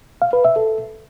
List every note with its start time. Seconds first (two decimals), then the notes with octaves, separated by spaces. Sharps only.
0.22 F5
0.33 B4
0.45 E5
0.56 A4